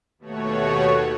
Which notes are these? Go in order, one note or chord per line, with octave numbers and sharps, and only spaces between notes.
D#2 B2 A3 F#4 C#5